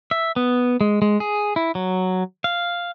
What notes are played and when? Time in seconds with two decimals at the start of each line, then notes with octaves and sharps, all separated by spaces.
0.11 E5
0.36 B3
0.81 G#3
1.02 G#3
1.20 G#4
1.56 E4
1.75 F#3
2.44 F5